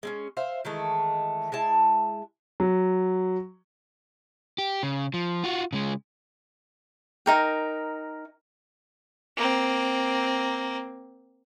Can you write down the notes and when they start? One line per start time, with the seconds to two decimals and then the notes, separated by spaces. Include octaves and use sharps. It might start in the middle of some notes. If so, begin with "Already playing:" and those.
0.03 G#3 C4 C#4
0.37 C5 E5 F5
0.65 D#3 E3 G#3 A3
1.52 G#3 E4 A5
2.60 F#3
4.58 G4
4.83 C#3
5.14 F3
5.44 F4 F#4
5.73 C#3 G#3
7.26 D#4 A#4 G5
9.37 A#3 C4